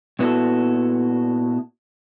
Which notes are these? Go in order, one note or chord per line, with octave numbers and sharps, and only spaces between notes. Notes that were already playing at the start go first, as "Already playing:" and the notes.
A#2 B3 E4 F#4 A4